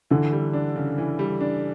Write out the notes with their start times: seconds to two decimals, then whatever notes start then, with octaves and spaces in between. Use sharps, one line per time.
0.10 D3 E3
0.32 G3
0.53 D4
0.76 C#3
0.98 E3
1.19 G3
1.41 D4